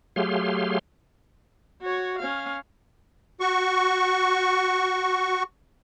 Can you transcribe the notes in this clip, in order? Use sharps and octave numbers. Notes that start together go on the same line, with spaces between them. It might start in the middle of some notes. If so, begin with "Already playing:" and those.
F#3 A3 G4 G#4 F5 C6
F#4 C#5
C#4 F5
F#4 C#6